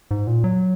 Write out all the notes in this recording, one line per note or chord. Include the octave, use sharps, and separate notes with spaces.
G#2
A#2
F#3